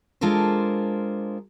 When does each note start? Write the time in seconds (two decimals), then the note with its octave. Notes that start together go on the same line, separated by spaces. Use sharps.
0.21 G#3 D4 F4 A4 A#4 C5